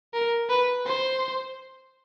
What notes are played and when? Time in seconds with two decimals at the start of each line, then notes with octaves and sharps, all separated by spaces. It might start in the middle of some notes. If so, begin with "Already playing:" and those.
0.14 A#4
0.50 B4
0.86 C5